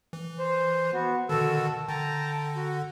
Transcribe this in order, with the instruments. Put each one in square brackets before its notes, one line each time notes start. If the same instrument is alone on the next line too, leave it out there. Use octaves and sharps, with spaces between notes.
[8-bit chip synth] E3
[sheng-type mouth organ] C5
B3 F#4
[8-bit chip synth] B2 D3 D#3 [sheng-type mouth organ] F#4 A4 E6
[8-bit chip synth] D3 [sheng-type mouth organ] G5 A5 A#5
[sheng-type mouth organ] F#4